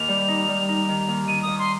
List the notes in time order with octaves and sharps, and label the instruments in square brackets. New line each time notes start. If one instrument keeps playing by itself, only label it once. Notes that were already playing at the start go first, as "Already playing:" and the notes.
Already playing: [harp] D#2 [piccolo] F7
[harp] G3
D#4
G3
D#4
D#3
D#2
[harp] D#3 [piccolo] D#7
[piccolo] D#6
[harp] D#2
[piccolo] C6